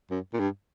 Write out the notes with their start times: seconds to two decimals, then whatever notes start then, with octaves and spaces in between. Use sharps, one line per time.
0.11 F#2
0.33 A#2
0.40 G2